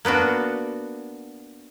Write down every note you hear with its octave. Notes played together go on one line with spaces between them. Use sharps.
A#3 B3 D4 F#4